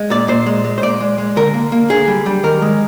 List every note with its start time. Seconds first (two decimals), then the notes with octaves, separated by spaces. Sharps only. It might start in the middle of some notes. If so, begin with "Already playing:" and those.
Already playing: G#3
0.10 A#2 D5
0.28 A#2 C5
0.46 G#3
0.64 G#3
0.78 C5
0.82 A#2 D5
1.00 G#3
1.18 G#3
1.36 D3 A#4
1.54 A#3
1.72 A#3
1.90 D3 G#4
2.08 G3
2.26 G3
2.43 D#3 A#4
2.62 G#3